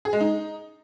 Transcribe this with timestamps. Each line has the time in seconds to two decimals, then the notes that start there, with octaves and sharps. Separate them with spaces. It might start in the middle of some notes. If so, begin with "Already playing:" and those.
0.05 G#4
0.13 G#3
0.21 D#4